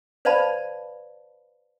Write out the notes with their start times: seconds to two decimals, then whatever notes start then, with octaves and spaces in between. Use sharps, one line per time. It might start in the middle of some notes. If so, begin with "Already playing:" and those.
0.25 B4 C5 D5 F5 A5 B5